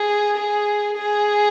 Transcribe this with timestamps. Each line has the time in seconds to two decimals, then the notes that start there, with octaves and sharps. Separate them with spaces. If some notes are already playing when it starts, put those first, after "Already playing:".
Already playing: G#4
0.36 G#4
0.97 G#4